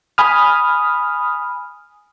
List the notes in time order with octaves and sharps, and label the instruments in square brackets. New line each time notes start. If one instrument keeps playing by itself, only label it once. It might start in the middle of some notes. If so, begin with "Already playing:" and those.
[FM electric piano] G#5 B5 D#6 F6